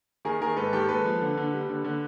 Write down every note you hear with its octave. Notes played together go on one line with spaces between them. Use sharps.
D#3 G#4 A#4
D#3 G#4 A#4
G#2 A4 B4
D#3 G4 A4
G#3 A4 B4
F3
D3
D3
G3
D3
D3